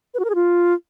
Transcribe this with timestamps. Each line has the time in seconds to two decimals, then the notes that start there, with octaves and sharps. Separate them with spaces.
0.14 B4
0.19 F#4
0.25 A#4
0.30 G#4
0.35 F4